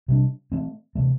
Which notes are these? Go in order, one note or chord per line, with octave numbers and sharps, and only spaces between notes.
C3 G3 D4
E3 A3 C4
C3 E3 A3